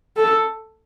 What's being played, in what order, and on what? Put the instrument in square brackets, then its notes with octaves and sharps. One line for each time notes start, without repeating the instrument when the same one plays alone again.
[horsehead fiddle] A4